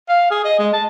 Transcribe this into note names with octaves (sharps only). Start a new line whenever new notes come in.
F5
G#4
D#5
G#3
A5